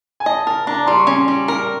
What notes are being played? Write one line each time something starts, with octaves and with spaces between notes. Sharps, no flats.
G#5
D#5 A5
A#4 A5
D4 A#5
G3 C6
C#6
C#4 C6
G3
A#4